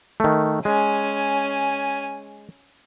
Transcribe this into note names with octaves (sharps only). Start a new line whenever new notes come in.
D#3 A3
G#3 C#4 G#5